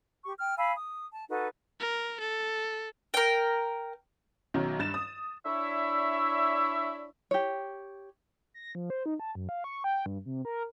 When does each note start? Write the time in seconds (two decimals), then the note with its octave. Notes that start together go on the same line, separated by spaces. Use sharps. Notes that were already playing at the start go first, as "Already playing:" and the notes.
0.24 G4 C#6
0.38 G5 F6
0.58 F5 G#5 B5 E6
0.76 D#6
1.12 A5
1.29 D#4 F#4 A4 B4
1.80 A#4
2.20 A4
3.14 A#4 G5
4.54 B1 F#2 D#3 F#3
4.79 G2 A6 E7
4.94 D#6
5.46 D4 E4 C#5 E5
7.31 G4 C#5
8.54 A#6
8.75 F3
8.90 C5
9.06 D#4
9.20 A5
9.35 F#2
9.49 F5
9.64 C#6
9.84 G5
10.06 G2
10.26 C3
10.45 A#4